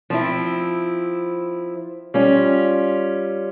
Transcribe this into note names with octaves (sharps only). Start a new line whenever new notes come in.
F3 C4 E4
G3 C#4 F4